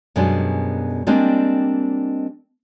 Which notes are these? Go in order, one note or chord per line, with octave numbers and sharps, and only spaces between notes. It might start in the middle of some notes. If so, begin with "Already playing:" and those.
F#2 B2 G3 G#3 D4
G3 G#3 A#3 C4 D4